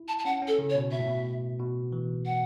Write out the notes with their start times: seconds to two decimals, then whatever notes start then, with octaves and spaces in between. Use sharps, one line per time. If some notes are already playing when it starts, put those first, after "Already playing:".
Already playing: E4
0.08 A5
0.19 A5
0.25 C#4 F#5
0.42 C#4
0.48 A4
0.59 C#3
0.70 C#5
0.75 B2
0.92 B2 E5
0.99 A2
1.08 B2
1.59 B2
1.92 E3
2.26 F#5